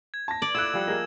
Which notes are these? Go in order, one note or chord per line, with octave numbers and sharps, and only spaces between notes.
G#6
A5 A#6
D5 F#7
E4 F4 A4 D6 E6 F#6 G#6 E7
F3 G3 F#5
A#3 G#4 A#4 D#5